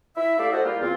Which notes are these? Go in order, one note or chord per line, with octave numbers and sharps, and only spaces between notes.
E4 E5
A3 E4 G4 D5 E5 F5
F#4 A4 C5 D5 D#5
G3 A#3 E4 F4 G4
E2 C4 F4